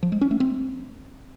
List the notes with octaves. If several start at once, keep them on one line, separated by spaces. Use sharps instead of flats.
F3
G#3
C#4
A3
C4